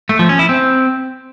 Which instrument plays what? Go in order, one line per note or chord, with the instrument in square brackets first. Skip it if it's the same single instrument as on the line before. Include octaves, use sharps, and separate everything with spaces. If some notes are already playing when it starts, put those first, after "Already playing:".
[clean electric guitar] A3
F3
C#4
E4
C4